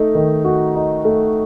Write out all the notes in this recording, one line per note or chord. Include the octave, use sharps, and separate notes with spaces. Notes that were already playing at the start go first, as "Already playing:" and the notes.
Already playing: A3 D#4
D#3
F#4
D#4
A3